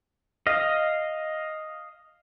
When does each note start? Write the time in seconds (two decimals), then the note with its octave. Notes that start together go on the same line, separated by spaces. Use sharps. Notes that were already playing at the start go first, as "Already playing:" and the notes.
0.47 D#5 F5